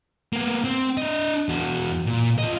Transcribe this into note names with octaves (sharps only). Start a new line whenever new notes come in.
A#3 B3
C4
D4 D#5
E2 F#4
A#2
F4 D#5